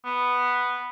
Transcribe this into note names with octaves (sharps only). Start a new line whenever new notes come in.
B3